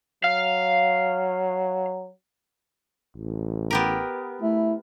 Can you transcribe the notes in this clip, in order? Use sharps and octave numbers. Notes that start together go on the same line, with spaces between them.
F#3 F5
A1
B3 G4 A#4
A3 E4